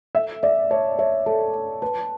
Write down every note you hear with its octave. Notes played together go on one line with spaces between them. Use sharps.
A4 E5
D5 E5
C#5 A5
C#5 E5
A4 A5
A5
B4 A5